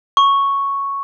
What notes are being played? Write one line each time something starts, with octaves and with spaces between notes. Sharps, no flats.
C#6